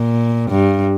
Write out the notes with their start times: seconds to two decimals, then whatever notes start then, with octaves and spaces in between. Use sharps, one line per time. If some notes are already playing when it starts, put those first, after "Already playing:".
Already playing: A#2
0.51 G2